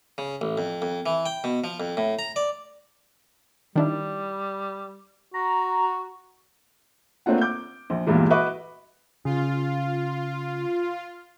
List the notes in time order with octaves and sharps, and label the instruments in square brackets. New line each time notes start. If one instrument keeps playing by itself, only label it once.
[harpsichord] C#3
A1
F2
F2
E3
G5
B2
F3
F2
A2
A#5
D5
[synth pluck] D#3 D4 E4 [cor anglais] G3
[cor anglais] F#4 [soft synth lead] A#5
[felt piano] A3 A#3 C4 D4 F4 F#5
D6 G6
A#1
E2 G2 A#2 E3 G#3
F#4 B4 D#5 E5 C#6 D6
[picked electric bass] C#3 [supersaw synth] F4